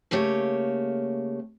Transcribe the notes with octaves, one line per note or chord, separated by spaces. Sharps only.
C#3 A3 A#3 G4 C#5